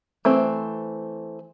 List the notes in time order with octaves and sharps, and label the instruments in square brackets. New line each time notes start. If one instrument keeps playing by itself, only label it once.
[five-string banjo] E3 A3 C4